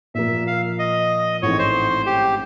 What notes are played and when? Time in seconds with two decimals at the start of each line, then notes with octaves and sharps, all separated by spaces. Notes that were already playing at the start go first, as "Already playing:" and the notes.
0.14 A#2 F3 A#3 E5
0.47 F5
0.79 D#5
1.42 A1 G#2 E3 A3 C4 C#5
1.59 C5
2.06 G4